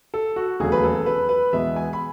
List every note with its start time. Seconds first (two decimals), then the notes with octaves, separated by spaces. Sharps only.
0.14 A4
0.36 F#4
0.60 E1 D#2 C#3 F#3 A3 G#4
0.72 B4
0.83 A4
1.06 B4
1.29 B4
1.53 E2 B2 G#3 B3 E5
1.76 G#5
1.93 B5